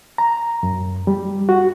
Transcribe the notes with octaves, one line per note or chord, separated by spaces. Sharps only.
A#5
F#2
G3
F#4